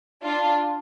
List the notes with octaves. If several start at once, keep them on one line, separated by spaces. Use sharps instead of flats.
D4 F4